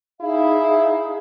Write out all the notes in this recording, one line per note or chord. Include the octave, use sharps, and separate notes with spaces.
D#4 E4 G#4 F5